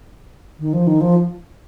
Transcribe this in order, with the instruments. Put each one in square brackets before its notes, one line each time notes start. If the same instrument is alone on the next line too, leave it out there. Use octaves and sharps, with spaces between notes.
[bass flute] D#3
F3
D#3
F3